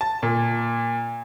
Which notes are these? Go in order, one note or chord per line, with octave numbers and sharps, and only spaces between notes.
A5
A#2